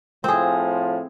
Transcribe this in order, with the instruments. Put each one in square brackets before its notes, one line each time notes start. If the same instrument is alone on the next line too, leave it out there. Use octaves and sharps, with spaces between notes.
[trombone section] A2 F3 [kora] C4 G#4